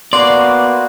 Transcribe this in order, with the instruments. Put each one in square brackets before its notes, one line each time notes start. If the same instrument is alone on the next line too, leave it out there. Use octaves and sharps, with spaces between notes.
[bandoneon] A#3 F#4 [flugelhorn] B3 [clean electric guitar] D5 [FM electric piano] C6